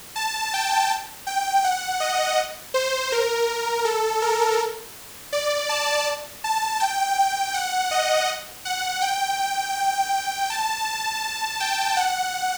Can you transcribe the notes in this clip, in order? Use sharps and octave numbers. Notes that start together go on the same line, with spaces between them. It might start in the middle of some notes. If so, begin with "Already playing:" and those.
A5
G5
G5
F#5
D#5
C5
A#4
A4
A#4
D5
A5
A5
G5
F#5
D#5
F#5
G5
G5
A5
A5
G5
F#5